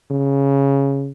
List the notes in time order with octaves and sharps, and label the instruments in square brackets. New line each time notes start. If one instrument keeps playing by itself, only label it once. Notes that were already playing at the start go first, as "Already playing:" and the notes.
[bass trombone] C#3